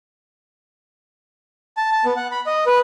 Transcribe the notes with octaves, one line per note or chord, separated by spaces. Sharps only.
A5
A5
B3
F#5
B5
D#5
B4